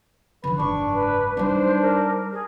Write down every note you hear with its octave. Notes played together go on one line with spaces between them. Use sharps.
D3 F3 B4
F#1 G#2 D4 C#6
B4
G3 D4 D#4 C5
A#4
G#4